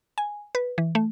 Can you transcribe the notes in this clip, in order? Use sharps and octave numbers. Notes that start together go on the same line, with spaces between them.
G#5
B4
E3
A3